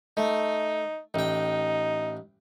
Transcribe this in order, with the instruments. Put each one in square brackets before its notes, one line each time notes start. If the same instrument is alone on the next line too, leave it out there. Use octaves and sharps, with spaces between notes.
[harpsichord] A3 [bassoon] D#4
[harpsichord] A1 G5 [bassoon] D#4